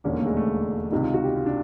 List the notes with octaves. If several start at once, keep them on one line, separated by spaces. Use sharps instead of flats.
E1 D#2 D3 C#4
A#3
A3
G#3
A3
C#2 C3 D#3 D#4
F4
F#4
G4
F4
D4